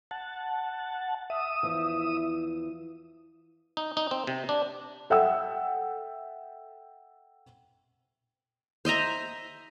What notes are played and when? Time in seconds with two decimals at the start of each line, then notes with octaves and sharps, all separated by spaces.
0.11 F#5 A5
1.30 E5 D#6
1.63 E2 E3 F3
3.77 D#4
3.97 D#4
4.11 C4
4.27 C3
4.49 D4
5.10 A4 E5 F#5 G5 E6
8.85 C5 D#5 E5 A#5